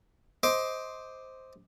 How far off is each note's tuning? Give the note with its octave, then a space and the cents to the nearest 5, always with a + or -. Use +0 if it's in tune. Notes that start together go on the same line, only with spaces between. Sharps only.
C5 +0 D#5 +25 D6 +10